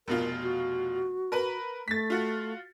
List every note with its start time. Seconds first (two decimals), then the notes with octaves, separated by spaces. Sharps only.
0.08 F1 B2 F4 A#4
0.43 F#4
1.32 A#4 B4 B5
1.88 A3 A6 B6
2.10 F4 F#4